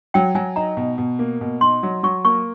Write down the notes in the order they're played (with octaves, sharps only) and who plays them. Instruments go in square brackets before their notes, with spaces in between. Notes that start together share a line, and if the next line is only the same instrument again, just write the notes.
[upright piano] F#3 [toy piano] G5
[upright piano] F#3 [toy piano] G#5
[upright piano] D#4 [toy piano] A#5
[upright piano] B2
B2
A#3
B2
[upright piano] D#4 [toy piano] C6
[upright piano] F#3
[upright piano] F#3 [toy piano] C#6
[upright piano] A#3 [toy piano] C#6